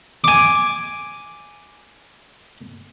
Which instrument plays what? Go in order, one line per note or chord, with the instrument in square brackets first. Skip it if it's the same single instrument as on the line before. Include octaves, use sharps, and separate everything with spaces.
[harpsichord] G#5 D6